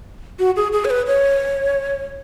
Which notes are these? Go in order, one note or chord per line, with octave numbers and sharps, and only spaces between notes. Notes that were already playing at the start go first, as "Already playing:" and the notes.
F#4
G#4
G#4
C#5
B4
C#5